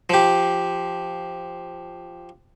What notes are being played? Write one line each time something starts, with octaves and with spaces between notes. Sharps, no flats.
F3 G4